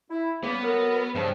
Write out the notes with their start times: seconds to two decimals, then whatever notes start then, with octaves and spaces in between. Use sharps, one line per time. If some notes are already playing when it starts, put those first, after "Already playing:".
0.11 E4
0.43 C#3 G3 A#3 B3
0.63 F#3 A4 A#4
1.15 G2 C#3 F3